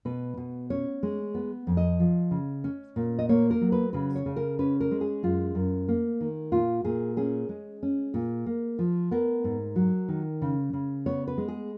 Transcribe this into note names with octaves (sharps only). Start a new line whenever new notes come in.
B2 B4
B2
C#4 C#5
G#3
B3
F2
D#5
F3
C#3
C#4
A#2
D#5
A#3 C#5
A#4
F#3
B4
C#3 B4
C#5
C#3
A#4
C#4 B4
A#4
G#3
G#4
F#2 F4
F#2
A#3
D#3
A#2 F4
A#2 G#4
C#4 G#4
G#3
C#4
A#2
A#3
F3
B3 A#4
G#2
F#3
D#3
C#3
C#3
B3 C#5
B4
G#3
G#4